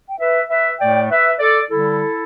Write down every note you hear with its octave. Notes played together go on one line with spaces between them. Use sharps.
G5
B4 E5
B4 E5
A2 A3 D5 G5
B4 E5
A4 D5
D3 G3 E4 A4